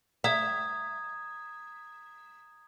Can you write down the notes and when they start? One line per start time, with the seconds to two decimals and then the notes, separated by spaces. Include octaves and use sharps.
0.24 E5 A#5 D#6 G#6